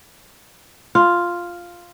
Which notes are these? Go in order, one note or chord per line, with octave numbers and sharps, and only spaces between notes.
F4